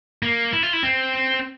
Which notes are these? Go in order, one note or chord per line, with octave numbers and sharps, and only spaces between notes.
A#3
E4
F4
E4
C4